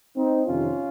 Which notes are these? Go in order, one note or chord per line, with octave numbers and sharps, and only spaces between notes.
C4 D#4
F2 C3 D#3 C#4 F4